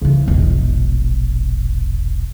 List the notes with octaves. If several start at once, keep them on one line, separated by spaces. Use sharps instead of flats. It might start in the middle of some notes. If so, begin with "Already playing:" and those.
C#3 E3
E1 A#1